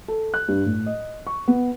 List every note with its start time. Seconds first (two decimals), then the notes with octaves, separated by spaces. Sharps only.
0.08 A4
0.34 F#6
0.48 G2
0.66 A2
0.86 D#5
1.27 C#6
1.48 B3